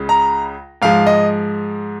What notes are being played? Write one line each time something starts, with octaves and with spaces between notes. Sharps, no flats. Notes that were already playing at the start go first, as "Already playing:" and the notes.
Already playing: C#2 C#3 G#3
A#5
G#2 F3 G#3 F5
D#5